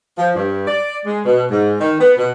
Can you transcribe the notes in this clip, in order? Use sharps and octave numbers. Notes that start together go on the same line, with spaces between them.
F3
G2
D5
G#3
B2
G#2
D#3
B3
B2